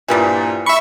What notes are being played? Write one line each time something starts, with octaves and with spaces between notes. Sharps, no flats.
G2 A#2 E3 F3 G3
E5 B5 C#6